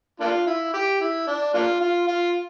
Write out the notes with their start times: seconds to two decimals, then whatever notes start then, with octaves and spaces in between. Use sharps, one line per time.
0.20 A#3 D4 F4
0.47 E4
0.74 G4
1.01 E4
1.27 D4
1.54 A#3 D4 F4
1.81 F4
2.07 F4